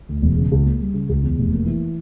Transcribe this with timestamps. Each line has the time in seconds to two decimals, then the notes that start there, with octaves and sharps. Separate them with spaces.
0.09 D2
0.22 E1
0.37 C#3
0.52 C#2
0.65 A#3
0.80 G3
0.94 C#3
1.09 C#2
1.23 E2
1.38 F1
1.53 A#3
1.66 E3